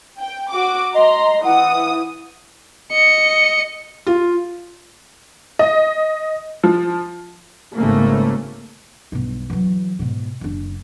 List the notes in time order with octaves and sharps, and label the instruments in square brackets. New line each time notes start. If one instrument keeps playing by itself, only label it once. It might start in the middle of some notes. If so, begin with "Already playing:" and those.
[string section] G5
F#4 D6
[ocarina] D#5 [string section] A#5 C6
[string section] E3 D#6 [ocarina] F#5
[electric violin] D#5 C#7
[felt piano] F4
[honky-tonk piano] D#5
F3
[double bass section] G#1 C#3 A3 A#3
[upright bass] B1 G2
E3 F#3
G#2 B2
F#1 D4